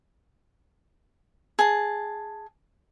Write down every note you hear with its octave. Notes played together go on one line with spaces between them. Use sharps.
G#4 A5